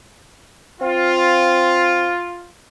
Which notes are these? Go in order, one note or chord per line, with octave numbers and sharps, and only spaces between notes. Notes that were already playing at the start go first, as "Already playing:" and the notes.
C4 F4